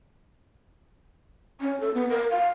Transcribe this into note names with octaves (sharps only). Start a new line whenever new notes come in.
C#4
A4
B3
A#4
F5